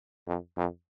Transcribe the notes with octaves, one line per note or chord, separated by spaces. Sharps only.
F2
F2